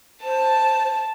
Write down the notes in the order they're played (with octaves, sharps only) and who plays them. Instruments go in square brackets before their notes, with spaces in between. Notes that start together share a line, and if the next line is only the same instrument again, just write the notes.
[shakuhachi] C5 [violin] A5